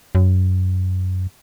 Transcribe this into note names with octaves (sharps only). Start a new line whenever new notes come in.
F#2